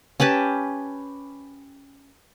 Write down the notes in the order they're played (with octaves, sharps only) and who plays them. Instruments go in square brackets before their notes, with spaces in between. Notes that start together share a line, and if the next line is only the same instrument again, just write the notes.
[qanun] C#4 G4 B4 A5